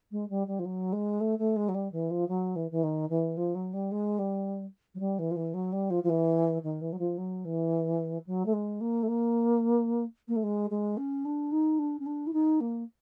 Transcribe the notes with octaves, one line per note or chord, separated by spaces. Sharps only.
G#3
G3
G3
F3
F#3
G#3
A3
A3
G#3
F#3
G3
E3
F3
F#3
E3
E3
D#3
E3
F3
F#3
G3
G#3
G3
F#3
G3
E3
F3
E3
F#3
G3
F3
F3
E3
D#3
E3
F#3
F3
F#3
E3
F#3
A3
G#3
A#3
A3
A#3
A#3
A3
G#3
G#3
C#4
D4
D#4
D4
C#4
D4
E4
D#4
A#3